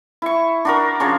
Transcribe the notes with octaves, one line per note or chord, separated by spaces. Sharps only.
E4 C#6
D4 F#4 A#4
C#3 F3 C#5